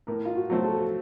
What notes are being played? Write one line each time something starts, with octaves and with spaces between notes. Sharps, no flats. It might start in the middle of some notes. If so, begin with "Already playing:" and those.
A2 A#4
F4
F#4
F#3 A3 C4 F#4
A4